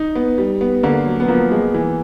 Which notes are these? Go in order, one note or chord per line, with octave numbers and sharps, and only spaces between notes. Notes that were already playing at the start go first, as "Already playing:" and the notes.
Already playing: D#4
B3
G3
B3
D3 A#3
F#3
B3
F3 A#3
G#3
E3